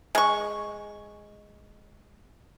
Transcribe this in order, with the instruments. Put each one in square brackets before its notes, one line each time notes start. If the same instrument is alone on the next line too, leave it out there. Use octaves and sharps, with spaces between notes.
[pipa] G#3 C#6